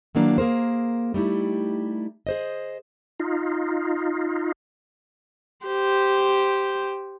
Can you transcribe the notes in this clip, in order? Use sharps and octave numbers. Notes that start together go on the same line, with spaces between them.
D#3 E3 F#3 A#3 D4
A#3 G#4 A#4 C5
G3 A3 D#4 E4 G4
G#4 C5 D#5
D#4 F4
G4 C5